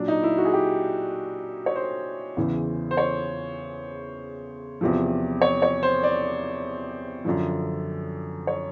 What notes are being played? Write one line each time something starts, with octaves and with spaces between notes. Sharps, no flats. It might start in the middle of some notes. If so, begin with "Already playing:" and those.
Already playing: A#2 F#3 D4
D#4
E4
F#4
G#4
G4
C#5
C5
E2 C#3 E3
C5
C#5
E2 C3 F3
C#5
C#5
C5
D5
F#2 D3 F3
C#5